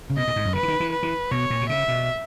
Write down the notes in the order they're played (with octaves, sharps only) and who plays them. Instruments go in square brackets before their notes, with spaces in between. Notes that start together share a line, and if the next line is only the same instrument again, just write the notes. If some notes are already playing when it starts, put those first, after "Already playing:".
[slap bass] C#3
[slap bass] B2 [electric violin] D#5
[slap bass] A#2
G#2
F#2
[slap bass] C#3 [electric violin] B4
[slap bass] E3
D#3
E3
[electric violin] B4
[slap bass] E3
[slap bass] B2 [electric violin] C#5
[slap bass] A#2
B2
[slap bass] C#3 [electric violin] E5
[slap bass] B2